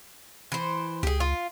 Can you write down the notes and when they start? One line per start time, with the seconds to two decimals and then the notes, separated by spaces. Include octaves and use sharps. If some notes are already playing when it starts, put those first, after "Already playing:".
0.52 E3 C5
1.03 C#2 G4 G#4
1.20 F4